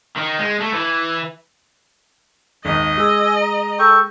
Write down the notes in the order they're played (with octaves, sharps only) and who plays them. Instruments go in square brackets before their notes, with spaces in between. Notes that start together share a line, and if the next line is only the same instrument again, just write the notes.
[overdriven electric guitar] D#3
G#3
A3
E3
[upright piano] G#1 D#2 [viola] D#5
[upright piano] G#3 [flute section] G#5 E6
[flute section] A#5
[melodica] A4 G5 C#6